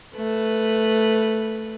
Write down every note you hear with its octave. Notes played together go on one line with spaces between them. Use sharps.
A3 B4